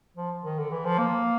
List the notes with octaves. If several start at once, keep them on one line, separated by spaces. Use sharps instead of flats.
F3
D#3
D3
E3
F3
A#3